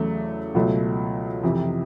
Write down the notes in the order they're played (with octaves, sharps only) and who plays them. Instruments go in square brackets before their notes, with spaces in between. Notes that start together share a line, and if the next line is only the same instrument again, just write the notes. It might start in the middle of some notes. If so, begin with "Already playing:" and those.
Already playing: [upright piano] E2 C#3 F#3 A3
C#2 B2 F#3 A3
F2 C3 E3